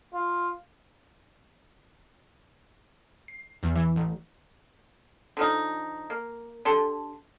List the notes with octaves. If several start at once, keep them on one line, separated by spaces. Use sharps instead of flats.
F4
C7
E2
E3
A1
D3 F3 D#4
A#3
D3 G4 A4 C6